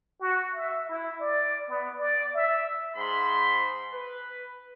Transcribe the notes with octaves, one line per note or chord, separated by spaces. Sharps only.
F#4
E5
E4
D5
B3
D5
E5
G#2 B5 C6
B4